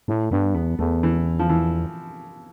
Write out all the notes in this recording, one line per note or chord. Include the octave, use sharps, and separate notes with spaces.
A2 A3
G2 B3
E2 B3
E2 A3
E3
F3
E3